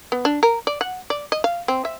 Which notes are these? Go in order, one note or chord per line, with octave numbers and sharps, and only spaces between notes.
B3
D4
A#4
D5
F#5
D5
D#5
F5
C4
E5